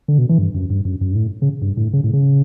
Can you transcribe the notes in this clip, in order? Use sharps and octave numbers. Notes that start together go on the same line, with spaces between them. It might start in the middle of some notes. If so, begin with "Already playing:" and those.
D3
B2
E3
G2
F#2
G2
F#2
F#2
G2
A2
C#3
G2
A2
C#3
A2
C#3